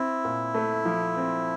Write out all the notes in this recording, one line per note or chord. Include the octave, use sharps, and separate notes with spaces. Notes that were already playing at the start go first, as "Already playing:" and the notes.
Already playing: C4 E4
A#2
A3
F3
C4